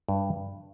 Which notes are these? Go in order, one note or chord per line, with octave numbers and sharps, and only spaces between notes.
G2